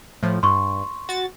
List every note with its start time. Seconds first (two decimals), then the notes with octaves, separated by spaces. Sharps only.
0.23 A2 F3
0.43 G2 C6 C#6
1.09 F#4 A6